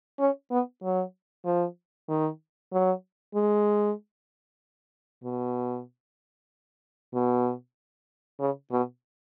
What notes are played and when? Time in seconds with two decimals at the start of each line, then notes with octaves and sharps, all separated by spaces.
0.19 C#4
0.51 B3
0.83 F#3
1.46 F3
2.09 D#3
2.72 F#3
3.35 G#3
5.24 B2
7.14 B2
8.40 C#3
8.72 B2